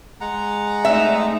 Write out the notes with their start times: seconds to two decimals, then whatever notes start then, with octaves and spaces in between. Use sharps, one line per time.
0.21 G#3 F#5 A#5
0.85 A3 C4 D#4 E5